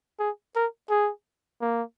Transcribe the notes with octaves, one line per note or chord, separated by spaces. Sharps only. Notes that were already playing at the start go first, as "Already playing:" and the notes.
G#4
A#4
G#4
A#3